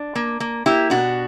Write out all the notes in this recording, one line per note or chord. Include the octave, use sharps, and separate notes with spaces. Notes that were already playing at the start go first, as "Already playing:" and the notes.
Already playing: D4
A#3
A#3
A#3 E4 G4
B2 D4 F#4